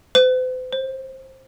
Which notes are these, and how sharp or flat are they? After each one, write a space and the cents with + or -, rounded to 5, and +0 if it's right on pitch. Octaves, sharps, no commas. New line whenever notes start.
C5 -45
C5 +20